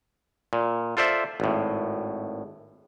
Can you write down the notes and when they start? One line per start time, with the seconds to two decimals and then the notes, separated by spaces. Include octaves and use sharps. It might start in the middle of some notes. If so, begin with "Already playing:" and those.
0.53 A#2
0.97 F4 A4 C5 D5 E5
1.40 G#1 A2